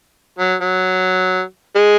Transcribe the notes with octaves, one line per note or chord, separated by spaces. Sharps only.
F#3
F#3
G#3